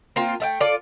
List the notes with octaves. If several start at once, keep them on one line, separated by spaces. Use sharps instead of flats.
A#3 C4 F4
A3 E5 G5
F4 A4 D5